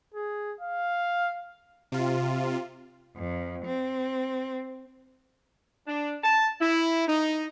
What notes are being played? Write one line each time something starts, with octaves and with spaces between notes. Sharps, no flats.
G#4
F5
C3 F4
F2
C4
D4
A5
E4
D#4